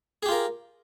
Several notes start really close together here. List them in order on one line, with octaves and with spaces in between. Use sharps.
G#4 G4 F4 A#4